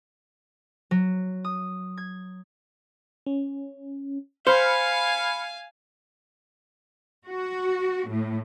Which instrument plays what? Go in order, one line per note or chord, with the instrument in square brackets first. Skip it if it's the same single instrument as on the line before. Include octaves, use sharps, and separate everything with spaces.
[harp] F#3
D#6
G#6
[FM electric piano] C#4
[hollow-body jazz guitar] C5 [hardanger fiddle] F5 G#5 [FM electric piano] B5 F6 C#7
[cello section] F#4
A2